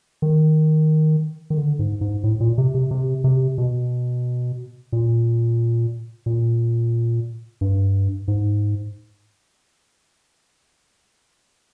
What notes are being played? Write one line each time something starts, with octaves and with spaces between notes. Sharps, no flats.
D#3
D#3
D3
G#2
G#2
A2
A#2
C3
C3
C3
C3
B2
A#2
A#2
G2
G#2